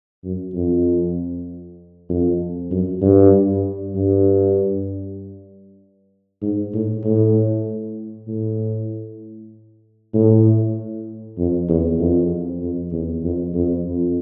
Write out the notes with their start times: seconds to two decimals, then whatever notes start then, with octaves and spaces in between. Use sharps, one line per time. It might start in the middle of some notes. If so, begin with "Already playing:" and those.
0.24 F#2
0.54 F2
2.09 F2
2.71 F#2
3.02 G2
3.95 G2
6.42 G#2
6.74 A2
7.04 A2
8.28 A2
10.14 A2
11.38 F2
11.69 E2
12.00 F2
12.61 F2
12.92 E2
13.24 F2
13.54 F2
13.86 F2